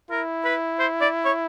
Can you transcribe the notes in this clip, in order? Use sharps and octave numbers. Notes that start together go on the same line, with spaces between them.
E4 A#4
B4
C5
D5
C#5